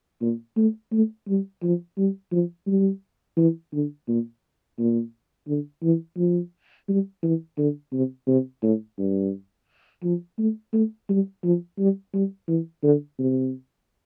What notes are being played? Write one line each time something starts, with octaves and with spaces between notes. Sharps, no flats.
A#2
A3
A3
G3
F3
G3
F3
G3
E3
D3
A#2
A#2
D3
E3
F3
G3
E3
D3
C3
C3
A2
G2
F3
A3
A3
G3
F3
G3
G3
E3
D3
C3